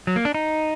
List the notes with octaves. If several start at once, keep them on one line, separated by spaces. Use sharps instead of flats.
F#3
A#3
D4
D#4